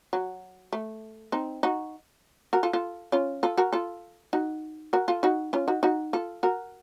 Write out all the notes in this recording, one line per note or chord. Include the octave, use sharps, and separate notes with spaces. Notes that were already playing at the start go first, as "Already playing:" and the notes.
F#3
A3
C4 D#4
D#4 F#4
F#4 A#4
F4 A4
F4 A4
C#4 F4
F4 A4
F#4 A#4
F4 A4
D#4 F#4
F#4 A#4
F4 A4
D#4 F#4
C#4 F4
D#4 F#4
D#4 F#4
F4 A4
F#4 A#4